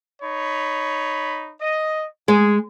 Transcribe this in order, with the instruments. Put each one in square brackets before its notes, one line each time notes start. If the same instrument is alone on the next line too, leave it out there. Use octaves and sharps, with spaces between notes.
[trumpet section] D#4 C#5 B5
D#5
[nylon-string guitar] G#3 [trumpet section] G#4